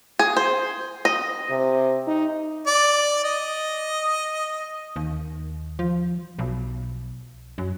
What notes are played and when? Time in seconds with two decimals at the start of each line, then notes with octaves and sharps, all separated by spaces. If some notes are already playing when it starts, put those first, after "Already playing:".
0.19 G#4
0.37 C5
1.05 D#5
1.50 C3
2.07 D#4
2.67 D5
3.24 D#5
4.96 D#2
5.79 F3
6.39 B1
7.58 F#2